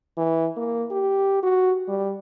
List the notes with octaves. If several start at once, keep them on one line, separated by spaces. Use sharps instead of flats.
E3
A#3
G4
F#4
G3